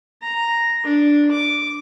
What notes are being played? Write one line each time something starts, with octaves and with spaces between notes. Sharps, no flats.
A#5
D4
D6